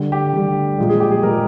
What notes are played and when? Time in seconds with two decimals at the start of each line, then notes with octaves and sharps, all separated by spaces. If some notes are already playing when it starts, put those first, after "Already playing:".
Already playing: D3 G3
0.12 G4
0.33 D3 G3
0.79 A#2 F3 G#3
0.89 G#4
1.00 G4
1.11 G#4
1.23 A#2 F3 G#3 A#4